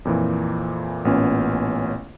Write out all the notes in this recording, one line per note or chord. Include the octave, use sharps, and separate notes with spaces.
F2 A#2 E3
A1 A#2 B3 C#4